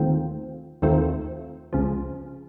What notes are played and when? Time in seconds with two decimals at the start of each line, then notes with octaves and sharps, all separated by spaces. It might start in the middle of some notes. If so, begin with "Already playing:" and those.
Already playing: D#2 D#3 A3 C4 F4
0.82 D#2 D#3 A3 C4 F4
1.73 C#2 C#3 F3